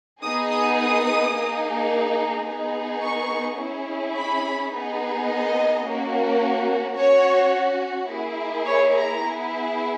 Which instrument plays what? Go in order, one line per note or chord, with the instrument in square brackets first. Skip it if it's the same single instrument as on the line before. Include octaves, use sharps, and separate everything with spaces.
[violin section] B3 D#4 G#4 D#6
D#6
D#6
A#3 D#4 G#4
B3 D#4 G#4
C#6
C#4 E4 G#4
B5
B3 D#4 G#4
D#5
A#3 C#4 F#4
C#4 F#4 C#5
A#3 E4 G#4
C#5
A#5
B3 E4 G#4